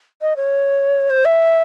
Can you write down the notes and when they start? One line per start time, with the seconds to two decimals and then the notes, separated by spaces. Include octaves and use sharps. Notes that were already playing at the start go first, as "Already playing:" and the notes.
0.21 D#5
0.36 C#5
1.10 C5
1.25 E5